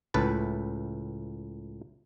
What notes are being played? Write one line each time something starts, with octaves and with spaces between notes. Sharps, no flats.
C#2 A2 B4 A5